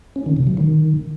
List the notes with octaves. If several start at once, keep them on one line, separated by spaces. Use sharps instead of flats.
C#4
D#3
C3
F#3
D#3